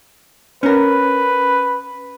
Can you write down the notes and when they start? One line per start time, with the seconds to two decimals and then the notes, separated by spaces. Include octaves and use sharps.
0.63 C#4 A#4 B4